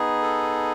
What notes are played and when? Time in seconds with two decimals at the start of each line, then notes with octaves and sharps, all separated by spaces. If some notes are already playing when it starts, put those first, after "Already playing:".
Already playing: B3 D#4 G#4
0.22 A4